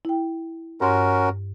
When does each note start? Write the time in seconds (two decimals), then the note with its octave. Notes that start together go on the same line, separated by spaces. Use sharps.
0.05 E4 G5
0.81 G2 C#4 F#4 A#4 C6